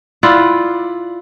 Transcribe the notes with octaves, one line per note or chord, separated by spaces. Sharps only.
E4 F4 D5 F#5